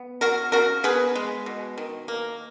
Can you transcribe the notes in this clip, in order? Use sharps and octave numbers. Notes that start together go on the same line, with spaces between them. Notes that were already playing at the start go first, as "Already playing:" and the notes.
Already playing: B3
F#3 F#4 A#4
C#3 F#4 A#4
B3 G#4 B4
G#3
B2
D#3
A#3